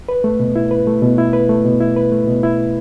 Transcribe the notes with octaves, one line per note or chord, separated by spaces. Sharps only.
B4
A3
B2
E4
B4
A3
B2
E4
B4
A3
B2
E4
B4
A3
B2
E4